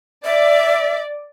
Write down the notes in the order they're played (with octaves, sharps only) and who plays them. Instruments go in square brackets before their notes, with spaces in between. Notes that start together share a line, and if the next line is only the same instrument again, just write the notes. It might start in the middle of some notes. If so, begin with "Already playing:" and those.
[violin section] D5 [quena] E5